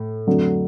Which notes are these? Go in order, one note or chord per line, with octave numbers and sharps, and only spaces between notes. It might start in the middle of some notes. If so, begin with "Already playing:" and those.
Already playing: A2
F2 D3 F#3 A3